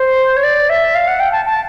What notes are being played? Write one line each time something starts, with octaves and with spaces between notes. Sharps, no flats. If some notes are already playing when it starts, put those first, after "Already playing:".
Already playing: C5
C#5
D5
E5
F5
F#5
G5
A5
A5